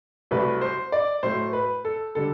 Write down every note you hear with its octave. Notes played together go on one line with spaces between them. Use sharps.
C2 C3 F#3 A3 B4
C5
D5
A2 F#3 A3 C5
B4
A4
D3 G3 A4